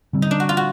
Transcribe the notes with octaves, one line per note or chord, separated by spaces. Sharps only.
D3 G3 C4
D#4
D4
F#4
F4
F#4